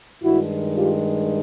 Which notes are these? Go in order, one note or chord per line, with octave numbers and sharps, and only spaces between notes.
G2 D#3 G#3 E4 F#4
F4 G4